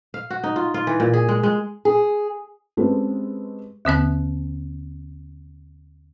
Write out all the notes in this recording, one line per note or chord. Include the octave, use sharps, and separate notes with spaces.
F5
F#4
D#4
F4
F4
E3
A#2
G#4
G#3
G#3
G#4
G#3 C4 C#4 G4 A4 B4
D#2 D3 B3 F#6